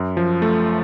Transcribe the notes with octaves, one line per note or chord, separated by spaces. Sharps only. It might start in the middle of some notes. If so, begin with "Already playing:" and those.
Already playing: F#2
F3
A3